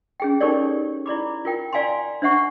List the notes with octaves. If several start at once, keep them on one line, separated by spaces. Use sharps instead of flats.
C#4 G#4 G5
D#4 G4 A4 A#4 C#5 D5
E4 D5 B5 D6
F4 A#4 G5
D5 F5 G#5 A#5 C6
D4 C5 E5 F#5 C#6